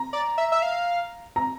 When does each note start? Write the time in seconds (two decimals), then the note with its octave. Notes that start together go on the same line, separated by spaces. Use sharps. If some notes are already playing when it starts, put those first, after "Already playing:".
Already playing: A#5
0.13 D5
0.38 E5
0.52 E5
0.62 F5
1.36 A#5